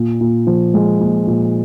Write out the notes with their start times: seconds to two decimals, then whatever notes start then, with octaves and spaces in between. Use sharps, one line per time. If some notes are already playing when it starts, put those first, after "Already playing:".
Already playing: A#2
0.21 A#2
0.47 F3
0.74 G#3
1.00 A#2
1.27 A#2